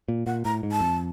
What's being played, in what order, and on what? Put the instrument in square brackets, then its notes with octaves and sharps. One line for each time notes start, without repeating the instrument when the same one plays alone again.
[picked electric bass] A#2
[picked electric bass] A#2 [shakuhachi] F#5
[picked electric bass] A2 [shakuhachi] A#5
[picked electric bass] G#2
[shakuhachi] A5
[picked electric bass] F2